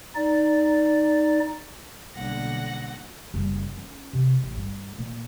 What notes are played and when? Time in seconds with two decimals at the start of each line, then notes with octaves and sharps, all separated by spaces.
0.16 D#4 D5
2.16 B1 D3 G3 A#3 D4 F#5 A#6
3.34 F#1 G3
3.77 C#4
4.13 C3
4.43 A1
4.57 G2
4.98 A#2 A#3